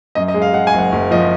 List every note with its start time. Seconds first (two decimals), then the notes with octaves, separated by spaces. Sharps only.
0.15 F#2 D#5
0.28 D#5
0.34 G#3
0.42 F5
0.53 G#3 F#5
0.67 G#5
0.73 F#1 F#5
0.92 F#1
1.11 F3 D#5